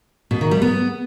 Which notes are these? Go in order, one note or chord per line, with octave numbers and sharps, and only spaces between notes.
B2
D#3
G3
B3